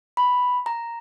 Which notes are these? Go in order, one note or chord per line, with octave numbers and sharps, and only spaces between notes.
B5
A#5